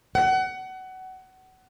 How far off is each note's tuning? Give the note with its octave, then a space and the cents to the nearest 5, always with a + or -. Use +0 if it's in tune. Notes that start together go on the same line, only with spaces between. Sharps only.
F#5 +25